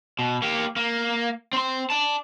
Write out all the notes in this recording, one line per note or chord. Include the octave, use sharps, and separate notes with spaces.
B2
A#3 G4
A#3
C4 C6
D5 A5